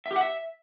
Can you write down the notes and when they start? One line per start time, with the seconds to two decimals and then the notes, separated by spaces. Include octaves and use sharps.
0.06 E5
0.11 G4
0.16 F#5
0.21 E5